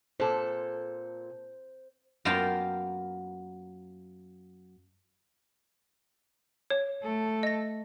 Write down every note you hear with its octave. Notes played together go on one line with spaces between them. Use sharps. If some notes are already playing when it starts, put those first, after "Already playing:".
A#2 A4 C5
F#2 A#3 B3 F4 G5 A5
C#5
A3 A4
D#5 A#6